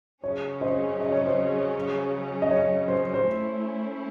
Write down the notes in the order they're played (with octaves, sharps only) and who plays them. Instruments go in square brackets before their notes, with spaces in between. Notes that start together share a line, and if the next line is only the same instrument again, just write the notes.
[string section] C#3 F#3 C#4 [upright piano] C#5
[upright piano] C5 D#5
D#5
C#5
C5 D#5
D#5
C#5
C5
C5
[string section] A3 C#4 E4